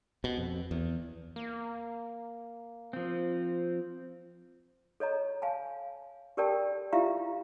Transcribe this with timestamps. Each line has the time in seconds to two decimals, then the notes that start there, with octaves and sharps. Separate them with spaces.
0.24 B2
0.37 F2
0.71 E2
1.36 A#3
2.93 F3 C4
5.00 A4 C#5 D#5 A#5
5.42 F5 G#5 A5
6.37 G4 A4 A#4 D5 G5 A5
6.93 E4 F4 G4 E5 F5 A#5